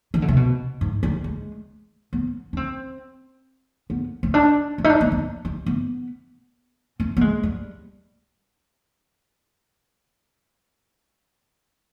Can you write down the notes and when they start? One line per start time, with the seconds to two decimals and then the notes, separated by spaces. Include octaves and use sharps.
0.14 D#3
0.22 D3
0.28 C3
0.36 B2
0.81 G#2
1.03 G3
1.24 G#3
2.13 B3
2.53 D4
2.57 C4
3.90 B3
4.23 C4
4.34 D4
4.78 C4
4.84 D#4
4.89 D4
5.01 B3
5.12 B3
5.45 G3
5.66 B3
7.00 C4
7.17 B3
7.21 G#3
7.43 G3